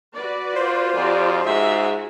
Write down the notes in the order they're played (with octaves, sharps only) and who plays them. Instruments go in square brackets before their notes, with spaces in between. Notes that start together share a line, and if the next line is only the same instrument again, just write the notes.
[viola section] F#4 B4 D5
[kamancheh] F4 [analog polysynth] C5
[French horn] F2 [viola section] F#4 G4 D5
[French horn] G#2 [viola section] F4 F#4 G#4 [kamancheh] E5